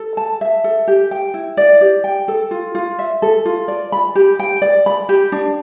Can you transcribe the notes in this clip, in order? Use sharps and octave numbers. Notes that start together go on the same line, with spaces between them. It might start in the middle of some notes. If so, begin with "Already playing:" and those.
Already playing: A4
A5
E5
A4
G4
G5
E4
D5
G4
G5
A4
F4
F4
E5
A4
F4
D5
B5
G4
G5
D5
B5
G4
D4